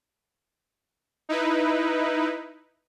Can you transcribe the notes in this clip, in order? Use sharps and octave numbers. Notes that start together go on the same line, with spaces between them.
D#4 E4 B4